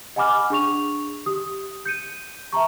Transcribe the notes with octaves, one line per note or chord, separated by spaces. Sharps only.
D#5 F#5 G#5 B5 D6 F6
D4 G#4 C#6 F7
G4 D#6
G6 C#7 D#7
E5 A5 A#5 C#6